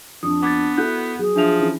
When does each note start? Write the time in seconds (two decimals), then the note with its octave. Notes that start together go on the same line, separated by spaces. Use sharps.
0.23 F2 D4 D#6
0.42 B3 D6 G#6 A6
0.77 E4 F#4 A4 F#6 G6
1.19 F#3 G#4
1.36 F3 D4 E5 F7
1.60 E3 C#4